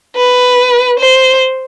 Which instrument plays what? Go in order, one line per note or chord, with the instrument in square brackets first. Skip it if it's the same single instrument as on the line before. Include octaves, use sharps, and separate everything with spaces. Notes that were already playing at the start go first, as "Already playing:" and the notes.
[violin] B4
C5